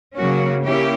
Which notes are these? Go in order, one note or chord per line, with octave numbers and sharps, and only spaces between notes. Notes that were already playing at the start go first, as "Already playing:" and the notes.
C#3 F#3 A#3 C#4 F#4
A#3 C#4 E4 G4